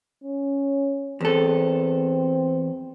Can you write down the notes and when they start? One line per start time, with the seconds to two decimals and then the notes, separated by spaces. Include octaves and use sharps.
0.24 C#4
1.21 E2 C4 A4